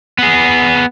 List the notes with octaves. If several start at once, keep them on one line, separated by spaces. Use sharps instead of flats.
B3 G#4